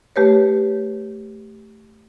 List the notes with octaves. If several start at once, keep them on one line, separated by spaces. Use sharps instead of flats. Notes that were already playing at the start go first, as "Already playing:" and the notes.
A3 G4 B4 C#5